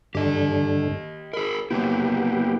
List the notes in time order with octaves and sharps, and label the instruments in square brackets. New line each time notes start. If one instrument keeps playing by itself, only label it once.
[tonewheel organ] G2 D3 [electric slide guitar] G4 D#5
[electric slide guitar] G#4 A#4 [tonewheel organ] B5
[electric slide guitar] F#3 A#3 E4 [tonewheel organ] B3 G4